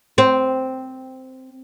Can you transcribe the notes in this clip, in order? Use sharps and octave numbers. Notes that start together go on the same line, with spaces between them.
C4